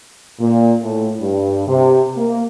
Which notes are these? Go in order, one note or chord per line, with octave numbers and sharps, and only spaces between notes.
A#2
A2
G2
C3
A#3